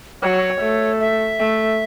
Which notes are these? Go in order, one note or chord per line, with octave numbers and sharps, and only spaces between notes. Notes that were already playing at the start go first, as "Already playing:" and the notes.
F#3 C#5
A3
E5
A3